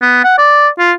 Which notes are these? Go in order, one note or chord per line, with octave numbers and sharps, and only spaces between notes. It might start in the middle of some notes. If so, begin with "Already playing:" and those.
B3
F#5
D5
F4